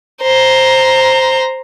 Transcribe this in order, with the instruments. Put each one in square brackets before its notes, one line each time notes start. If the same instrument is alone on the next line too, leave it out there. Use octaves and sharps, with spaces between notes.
[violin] C5 A#5